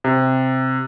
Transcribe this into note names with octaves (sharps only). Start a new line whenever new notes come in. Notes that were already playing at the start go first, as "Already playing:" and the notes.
C3